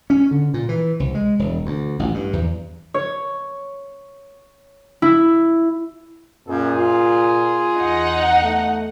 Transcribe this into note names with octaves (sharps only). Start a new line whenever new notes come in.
C#4
D3
A#2
E3
C2
G#3
E1
D2
A1
G2
E2
C#5
E4
F#2 A#2 G#4
F4
E2 D#4 F#5
A3